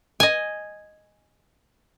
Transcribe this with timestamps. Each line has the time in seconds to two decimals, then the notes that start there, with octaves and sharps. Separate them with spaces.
0.20 D#5 G#5